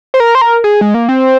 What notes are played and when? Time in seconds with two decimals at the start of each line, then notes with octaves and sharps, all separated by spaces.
0.14 C5
0.20 A#4
0.35 C5
0.41 A#4
0.64 G#4
0.81 G#3
0.94 A#3
1.09 C4